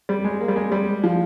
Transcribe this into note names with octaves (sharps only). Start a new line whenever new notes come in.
G3
G#3
A#3
G3
G#3
G3
F3